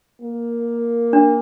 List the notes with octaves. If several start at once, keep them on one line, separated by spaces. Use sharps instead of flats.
A#3
D4